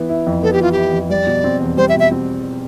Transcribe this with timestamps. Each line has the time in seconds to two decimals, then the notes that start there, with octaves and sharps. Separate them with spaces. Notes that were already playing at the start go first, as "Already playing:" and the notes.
Already playing: E3 B3
0.09 E4
0.26 F2
0.43 B3 A4
0.53 G4
0.60 E3 F4
0.72 G4
0.77 E4
0.93 F2
1.10 G3 D5
1.27 B2
1.44 C4
1.60 E2
1.77 G3 C5
1.89 E5
1.94 B2
1.99 E5
2.11 C4